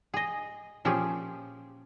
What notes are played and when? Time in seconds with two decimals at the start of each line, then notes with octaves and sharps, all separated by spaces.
0.14 G#4 D#5
0.85 A#2 F3 C#4 G4 G#4 G5